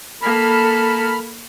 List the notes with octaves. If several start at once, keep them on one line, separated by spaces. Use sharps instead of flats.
A#3 A4 B5 F6